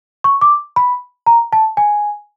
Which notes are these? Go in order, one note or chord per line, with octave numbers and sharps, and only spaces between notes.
C#6
D6
B5
A#5
A5
G#5